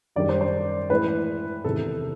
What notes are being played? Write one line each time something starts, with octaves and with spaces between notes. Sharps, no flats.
F#2 D#3 G3 D5
C5
C5
A2 E3 G#3 B4
E2 C3 D#3 A4